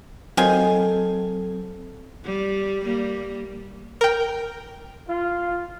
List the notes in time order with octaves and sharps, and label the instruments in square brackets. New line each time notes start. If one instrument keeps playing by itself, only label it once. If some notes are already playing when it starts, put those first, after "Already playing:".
[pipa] D#3 F4 G#5 [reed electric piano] F#3 C4 [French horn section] A4
[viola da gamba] G3
G3 A#3
[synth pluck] A#4 G5
[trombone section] F4